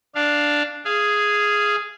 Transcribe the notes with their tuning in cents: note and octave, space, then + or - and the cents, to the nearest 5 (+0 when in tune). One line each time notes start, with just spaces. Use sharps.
D4 +0 F5 +0
G#4 +0 F5 -25